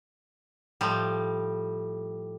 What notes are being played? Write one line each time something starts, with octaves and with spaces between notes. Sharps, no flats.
A2 F3 G3